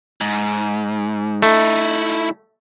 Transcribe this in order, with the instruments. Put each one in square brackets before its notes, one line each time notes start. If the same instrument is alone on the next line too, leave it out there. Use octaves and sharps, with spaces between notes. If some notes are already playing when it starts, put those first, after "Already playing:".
[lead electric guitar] G#2
[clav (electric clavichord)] A3 [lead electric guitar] D#4 E4